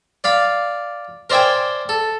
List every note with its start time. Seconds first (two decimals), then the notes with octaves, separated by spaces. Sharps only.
0.24 D5 F5 B5
1.30 A#4 C5 D5 E5 G5 G#5
1.89 A4